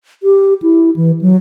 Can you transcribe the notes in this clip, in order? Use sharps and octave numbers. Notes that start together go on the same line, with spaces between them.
G4
E4
E3
F#3